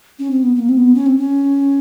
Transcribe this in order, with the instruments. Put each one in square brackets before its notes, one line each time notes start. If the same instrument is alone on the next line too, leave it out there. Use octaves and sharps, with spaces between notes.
[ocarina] C#4
C4
B3
B3
A#3
C4
B3
C#4
C4
C#4